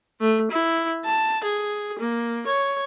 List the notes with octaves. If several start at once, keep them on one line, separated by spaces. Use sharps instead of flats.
A3
E4
A5
G#4
A#3
C#5